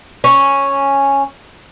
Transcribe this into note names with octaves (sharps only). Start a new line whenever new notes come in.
C#4